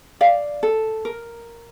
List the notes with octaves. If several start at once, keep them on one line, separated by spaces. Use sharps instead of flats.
D5 F5
A4
A#4